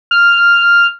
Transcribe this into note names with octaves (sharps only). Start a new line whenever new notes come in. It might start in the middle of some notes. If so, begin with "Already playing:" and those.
F6